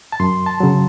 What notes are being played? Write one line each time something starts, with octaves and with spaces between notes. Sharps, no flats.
A5
F#2 C6
A5
C#3 F#3